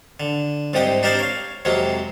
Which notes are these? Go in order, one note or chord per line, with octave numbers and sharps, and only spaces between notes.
D3
C2 G#2 C3 G#3 G4 D#6
D4 D#4 G4 A#4 C5 D5
C#5 F5
F2 C3 F#3 G#3 A#3